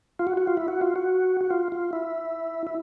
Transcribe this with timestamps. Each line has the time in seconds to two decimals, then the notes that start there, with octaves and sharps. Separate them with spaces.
0.19 F4
0.27 F#4
0.37 F#4
0.47 F4
0.57 E4
0.68 F#4
0.81 F4
0.96 F#4
1.41 F#4
1.50 F4
1.72 F4
1.93 E4
2.67 E4